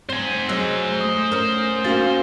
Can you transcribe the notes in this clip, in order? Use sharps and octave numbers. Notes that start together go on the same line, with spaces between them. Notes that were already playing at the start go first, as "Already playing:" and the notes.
C4 C5 G#5
F#3 G#3 C#4 E6
A3 D#6
C#4 A#4
A#3 C#4 F#4 A6